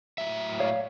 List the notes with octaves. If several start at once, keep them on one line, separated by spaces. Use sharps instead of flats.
A2 F#3 E5
C#5 D5 F5